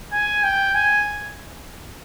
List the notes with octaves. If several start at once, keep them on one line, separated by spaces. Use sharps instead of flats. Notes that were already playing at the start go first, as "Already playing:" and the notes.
G#5
G5
G#5